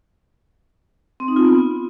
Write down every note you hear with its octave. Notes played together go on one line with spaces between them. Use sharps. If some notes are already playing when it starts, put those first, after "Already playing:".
C4
D#4
F4
B3